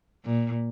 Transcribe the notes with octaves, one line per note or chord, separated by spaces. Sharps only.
A#2